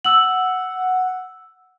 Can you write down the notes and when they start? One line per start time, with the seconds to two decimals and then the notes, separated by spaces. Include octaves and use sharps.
0.05 F#5 E6 F#7